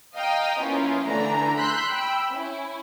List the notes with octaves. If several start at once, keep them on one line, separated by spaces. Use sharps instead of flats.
D#5 F5 G5 A#5 D#6
F3 A#3 B3 C#4 E4 F4
D3 E3 A3 D4 A#5
B5 C6 E6 F#6 G6 B6
G5 B5 E6
C#4 E4